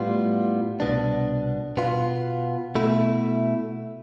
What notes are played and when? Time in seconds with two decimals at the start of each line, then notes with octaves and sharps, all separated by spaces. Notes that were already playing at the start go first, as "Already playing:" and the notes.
Already playing: A2 G3 B3 F4
0.80 C2 B2 B3 D4
1.77 B2 B3 F4
2.75 B2 A3 E4